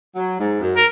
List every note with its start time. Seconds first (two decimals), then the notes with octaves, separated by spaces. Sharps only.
0.16 F#3
0.40 G#2
0.61 F#2
0.76 A#4